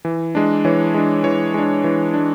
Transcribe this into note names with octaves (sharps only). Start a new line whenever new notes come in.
E3
G#3 D4
E3 C#5
G#3 D4
E3 C#5
G#3 D4
E3
G#3 D4